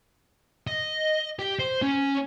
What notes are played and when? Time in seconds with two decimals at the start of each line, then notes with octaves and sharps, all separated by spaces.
0.67 D#5
1.39 G4
1.59 C5
1.82 C#4